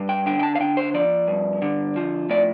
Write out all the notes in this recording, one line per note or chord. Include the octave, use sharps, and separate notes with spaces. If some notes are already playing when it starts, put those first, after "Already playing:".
Already playing: G2
G5
D3 G5
G5
A5
F5
D3 G5
C5
F3 D5
G2
D3
F3
A2 D5